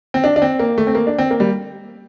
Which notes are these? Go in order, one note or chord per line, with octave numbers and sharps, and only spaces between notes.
C4
D4
D4
C4
A#3
A3
C4
A#3
D4
C4
A#3
G3